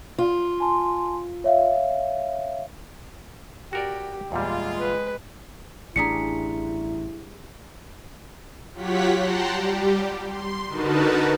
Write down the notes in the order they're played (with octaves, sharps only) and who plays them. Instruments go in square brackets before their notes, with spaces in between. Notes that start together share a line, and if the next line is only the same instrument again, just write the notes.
[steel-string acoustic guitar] F4
[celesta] G#5 A5 C6
C#5 E5 F5
[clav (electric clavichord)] F#4 A#4 D5 [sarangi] G4
[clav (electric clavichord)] E2 A#2 G3 [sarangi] G#3 [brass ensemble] F4
[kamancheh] B4
[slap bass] A1 [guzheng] G3 D4 G#4 [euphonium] E4 [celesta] A#5 B6 C#7
[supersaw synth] F#3 F4 G4 C#5 F#5 B6
F#5 G5 A5 A#5 C6
G3 G4
C6
D3 D#4 F#4 A#4 B4 A5